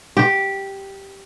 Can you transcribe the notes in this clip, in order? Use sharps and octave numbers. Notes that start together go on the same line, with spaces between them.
G4